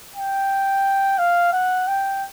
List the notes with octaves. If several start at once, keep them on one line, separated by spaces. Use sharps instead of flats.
G5
F5
F#5
G5